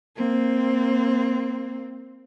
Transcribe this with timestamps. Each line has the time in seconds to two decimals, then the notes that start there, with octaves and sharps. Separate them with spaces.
0.16 A#3 C4